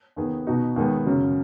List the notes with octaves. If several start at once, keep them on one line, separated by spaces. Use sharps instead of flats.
D#2 D#3 B3 G#4
B2 B3 D#4 F#4
D#2 D#3 G#3 B3 G#4
F#2 C#3 F#3